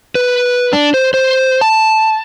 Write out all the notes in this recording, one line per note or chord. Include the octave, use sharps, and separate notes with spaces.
B4
D4
C5
C5
A5